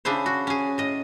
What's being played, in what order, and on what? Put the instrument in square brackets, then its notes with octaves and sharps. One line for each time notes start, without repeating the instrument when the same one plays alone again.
[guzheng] C#3 D4 E4 G#4 C5
F#4
C#4 G#4
A2 D#5